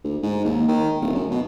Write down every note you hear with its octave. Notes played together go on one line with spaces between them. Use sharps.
D2
G#2
D#2
D#3
D1
F#2
B2